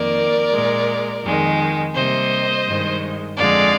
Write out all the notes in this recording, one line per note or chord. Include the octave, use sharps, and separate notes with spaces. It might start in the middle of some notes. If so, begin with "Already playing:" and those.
Already playing: F2 D#3 A#3 A#4 D5
A#2 G#3
F2 D#3 G#3
C3 G3 A#3 C5 D#5
G2 D#3 G#3
F2 D3 F3 G#3 D5 F5